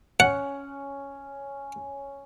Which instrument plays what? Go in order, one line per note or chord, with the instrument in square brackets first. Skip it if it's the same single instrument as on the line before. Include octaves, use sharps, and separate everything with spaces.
[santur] C#4 [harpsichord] F#5